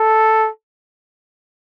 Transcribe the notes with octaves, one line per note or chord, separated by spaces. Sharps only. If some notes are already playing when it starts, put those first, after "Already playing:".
Already playing: A4